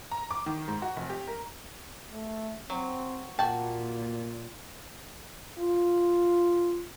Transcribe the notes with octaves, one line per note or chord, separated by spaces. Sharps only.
A#5
D6
D#3
G#2
F#4
F1
G4
A#4
A3
F#3 C4
A#2 A#3 F#4 G5 A5
F4